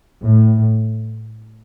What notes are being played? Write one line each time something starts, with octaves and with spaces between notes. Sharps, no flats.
A2